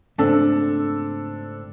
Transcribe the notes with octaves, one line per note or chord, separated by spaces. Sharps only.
G#2 C#3 A3 C4 D4 A4